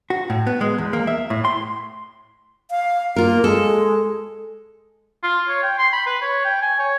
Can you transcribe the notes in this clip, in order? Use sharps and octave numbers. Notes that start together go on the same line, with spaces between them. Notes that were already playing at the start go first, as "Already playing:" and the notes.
F#4
A2
B3
G#3
E2
A#3
E5
A2
C6
F5
A#3 F4 A#4
G#3 A4
F4
C#5
G5
C6
B5
B4
C#5
G5
G#5
C#5